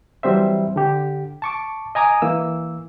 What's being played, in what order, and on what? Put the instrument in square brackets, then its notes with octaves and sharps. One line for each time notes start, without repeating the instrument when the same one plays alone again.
[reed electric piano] E3 F#3 G3 C4 C5 E5
D3 G4
A5 C#6 D6
D#5 G#5 A#5 D6 D#6
E3 A#3 E6